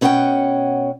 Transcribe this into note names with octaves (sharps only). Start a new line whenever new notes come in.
B2 C#4 A4 A#4 F#5 G5